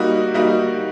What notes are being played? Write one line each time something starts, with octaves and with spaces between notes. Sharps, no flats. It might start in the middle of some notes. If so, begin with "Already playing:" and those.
Already playing: G3 A#3 D#4 F#4
G3 A#3 D#4 F#4